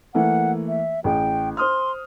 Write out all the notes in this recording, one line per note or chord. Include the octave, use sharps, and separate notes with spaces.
E3 A3 A#3 F#5
E5
A1 G#4 G5
C5 C6 D#6 F6